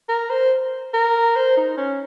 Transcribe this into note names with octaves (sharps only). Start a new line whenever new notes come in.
A#4
C5
A#4
C5
D#4
C#4